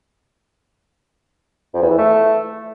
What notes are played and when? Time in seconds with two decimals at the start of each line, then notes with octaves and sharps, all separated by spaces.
1.74 F2
1.82 E2
1.90 E3
1.98 A3